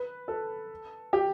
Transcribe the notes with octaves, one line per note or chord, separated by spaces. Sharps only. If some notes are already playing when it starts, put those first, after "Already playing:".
Already playing: B4
A4
G4